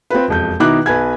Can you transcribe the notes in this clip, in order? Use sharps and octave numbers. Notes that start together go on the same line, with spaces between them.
C4 F4 B4
E1 F2 G6
B2 D#3 D#4 E4 D6 F#6
B1 B4 G#5 G#6